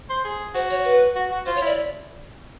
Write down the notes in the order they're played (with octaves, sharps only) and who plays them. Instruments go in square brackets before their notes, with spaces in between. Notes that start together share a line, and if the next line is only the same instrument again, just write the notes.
[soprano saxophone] C5
G#4
[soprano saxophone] F#4 [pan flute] C5
[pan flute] C#5
B4
[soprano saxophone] F#4
F#4
[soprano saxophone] F4 [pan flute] C5
[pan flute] C#5
[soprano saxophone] E4 [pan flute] D5